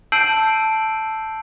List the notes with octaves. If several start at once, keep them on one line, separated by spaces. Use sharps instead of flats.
A5 E6 G6 C7 D7 F#7